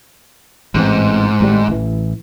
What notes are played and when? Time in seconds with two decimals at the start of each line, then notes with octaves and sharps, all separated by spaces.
0.75 A1 G#2 E3 C4
1.40 G#1 A2 G3
1.68 A1 E3